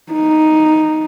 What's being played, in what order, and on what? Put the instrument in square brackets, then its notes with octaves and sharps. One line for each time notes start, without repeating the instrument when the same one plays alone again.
[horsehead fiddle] D#4